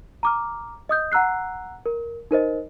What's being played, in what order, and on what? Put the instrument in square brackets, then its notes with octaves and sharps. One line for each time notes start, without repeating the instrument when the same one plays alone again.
[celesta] A#5 D6 F6
D#5 D#6 G6
F#5 A#5 E6 F#6 C7
A#4
D#4 A#4 C5 D#5